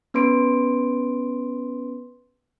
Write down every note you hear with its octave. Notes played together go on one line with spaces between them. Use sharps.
B3 C#4 B4 C6 D7